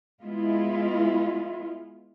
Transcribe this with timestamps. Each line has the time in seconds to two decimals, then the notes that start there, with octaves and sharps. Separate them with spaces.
0.22 G#3 B3 E4 F4